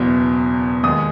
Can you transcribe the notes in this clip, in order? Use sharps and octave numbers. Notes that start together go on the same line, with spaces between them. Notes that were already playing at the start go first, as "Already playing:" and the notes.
Already playing: F#1 E2 B2
D#2 D#3 G#3 D#6